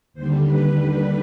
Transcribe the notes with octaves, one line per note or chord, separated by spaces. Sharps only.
D#2 D3 G3 C5
B4
B4